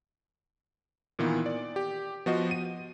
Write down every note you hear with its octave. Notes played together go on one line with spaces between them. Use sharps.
A#2 D#3 E3 B3
D5
G4
F3 B3 F#4 C5 D#5
D#7